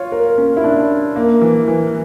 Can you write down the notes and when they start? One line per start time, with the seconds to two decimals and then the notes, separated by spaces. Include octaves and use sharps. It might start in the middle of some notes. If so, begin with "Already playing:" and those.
Already playing: F4 C#5
0.12 A#4
0.38 C#4
0.57 E4
0.64 D4
1.16 A#3
1.42 E3
1.68 E3